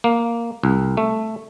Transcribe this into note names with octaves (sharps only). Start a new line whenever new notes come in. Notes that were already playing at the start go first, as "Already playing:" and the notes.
A#3
C2
A3